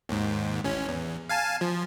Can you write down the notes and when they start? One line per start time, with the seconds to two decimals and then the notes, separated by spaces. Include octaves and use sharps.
0.09 D#2 G#2
0.64 A1 C#4
0.88 E2
1.30 F5 G#5 A5
1.61 F3